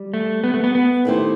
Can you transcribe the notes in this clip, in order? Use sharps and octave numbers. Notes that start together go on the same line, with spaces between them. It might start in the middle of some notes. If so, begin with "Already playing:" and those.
Already playing: G3
A3
B3
A3
B3
B3
D#3 A3 E4 G4 C5